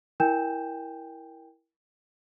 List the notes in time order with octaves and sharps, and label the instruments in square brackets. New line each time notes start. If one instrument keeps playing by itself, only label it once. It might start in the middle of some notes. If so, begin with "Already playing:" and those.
[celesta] E4 A#4 G5 G#5 G6 E7